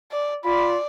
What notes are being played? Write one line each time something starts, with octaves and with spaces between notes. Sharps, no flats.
D5
F4 D5 B5